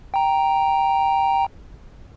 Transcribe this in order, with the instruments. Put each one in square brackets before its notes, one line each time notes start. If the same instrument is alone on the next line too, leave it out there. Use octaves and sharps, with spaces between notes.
[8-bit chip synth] G5 A#5